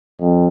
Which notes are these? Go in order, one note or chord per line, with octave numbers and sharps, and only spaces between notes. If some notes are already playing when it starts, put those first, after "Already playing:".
F2